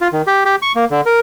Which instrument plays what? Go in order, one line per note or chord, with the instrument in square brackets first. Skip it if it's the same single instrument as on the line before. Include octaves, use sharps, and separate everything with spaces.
[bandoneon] F4
D#3
G4
G4
C#6
A#3
D3
A#4